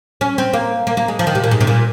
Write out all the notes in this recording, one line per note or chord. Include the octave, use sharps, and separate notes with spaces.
C#4
C4
A#3
A#3
A#3
G#3
F3
D#3
C3
A#2
G#2
C3
A#2